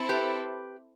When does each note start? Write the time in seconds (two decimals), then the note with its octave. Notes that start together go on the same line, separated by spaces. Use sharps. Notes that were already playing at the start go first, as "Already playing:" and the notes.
Already playing: C4 E4 A4
0.09 G4 B4